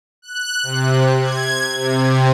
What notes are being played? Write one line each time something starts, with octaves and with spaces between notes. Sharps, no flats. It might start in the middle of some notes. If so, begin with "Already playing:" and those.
F#6
C3
G#6
C3